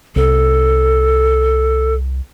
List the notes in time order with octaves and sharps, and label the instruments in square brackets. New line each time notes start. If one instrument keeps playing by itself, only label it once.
[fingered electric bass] C2 [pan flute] A4